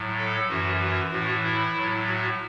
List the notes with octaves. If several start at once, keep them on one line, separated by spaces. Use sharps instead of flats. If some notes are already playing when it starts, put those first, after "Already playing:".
Already playing: A2 F#3
A4
F#2 E3 F#4
F#4
A2 E3 F#4
E4
A2 F#3
F#4